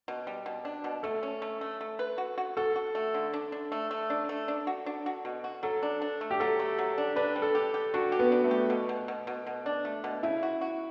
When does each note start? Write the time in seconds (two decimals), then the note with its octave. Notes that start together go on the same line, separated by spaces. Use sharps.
0.08 B2
0.27 G3
0.46 B2
0.65 D4
0.84 B2
1.03 A3 A4
1.23 C#4
1.42 A3
1.61 A3
1.81 A3
1.99 B4
2.18 F#4
2.38 F#4
2.57 F#4 A4
2.76 F#4
2.95 A3
3.14 D3
3.34 D4
3.52 D4
3.72 A3
3.91 A3
4.10 D4
4.29 A3
4.48 D4
4.67 F#4
4.86 D4
5.06 F#4
5.25 B2
5.44 F#4
5.63 F#3 A4
5.83 D4
6.02 D4
6.21 A3
6.31 G4
6.40 F#3 A4
6.59 A3
6.79 F#3
6.98 D4
7.16 D4 B4
7.36 G3
7.42 A4
7.55 G4
7.74 G4
7.94 D4 F#4
8.12 G4
8.19 B3
8.32 D4
8.44 A3
8.51 G4
8.70 B2
8.89 B2
9.08 B2
9.27 B2
9.47 B2
9.66 D4
9.85 A3
10.04 B2
10.23 C#3 E4
10.43 F#4
10.61 F#4